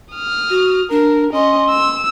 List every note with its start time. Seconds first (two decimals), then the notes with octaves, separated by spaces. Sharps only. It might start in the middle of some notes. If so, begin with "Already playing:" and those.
0.12 D#6 F6
0.50 F#4
0.90 D4 A#4
1.34 C#4 D#5 C6
1.70 E6